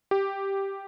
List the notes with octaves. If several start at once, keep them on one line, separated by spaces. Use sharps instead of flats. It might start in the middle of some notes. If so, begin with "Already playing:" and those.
G4